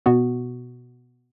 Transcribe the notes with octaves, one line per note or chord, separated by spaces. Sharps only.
B2 B3 F#4